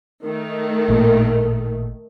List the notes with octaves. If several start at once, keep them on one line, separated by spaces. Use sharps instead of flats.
D#3 A3
A1 A#2